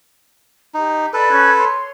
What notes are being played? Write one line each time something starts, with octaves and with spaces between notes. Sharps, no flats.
D#4 G4
A4 B4 D5 B5
C#4 F#6 G#6
C#5 C6